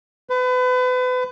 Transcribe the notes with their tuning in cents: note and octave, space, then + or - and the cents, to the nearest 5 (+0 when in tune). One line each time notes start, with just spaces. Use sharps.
B4 +35